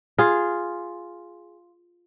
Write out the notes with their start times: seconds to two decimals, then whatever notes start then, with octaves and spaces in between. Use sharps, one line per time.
0.18 F4 G#4